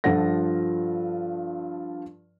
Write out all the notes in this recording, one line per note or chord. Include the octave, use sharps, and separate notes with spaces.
G2 F3 F4 A4 F#5 A#6